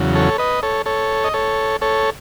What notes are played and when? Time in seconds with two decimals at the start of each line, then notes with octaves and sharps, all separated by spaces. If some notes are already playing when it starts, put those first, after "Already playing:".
Already playing: E2 C#3 F#3
0.15 A4 C#5
0.38 B4 D#5
0.63 A4 C#5
0.86 A4 C#5
1.24 D#5
1.34 A4 C#5
1.82 A4 C#5